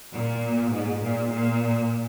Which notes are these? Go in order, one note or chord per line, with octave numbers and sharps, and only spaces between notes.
A#2
G#2
A#2
A#2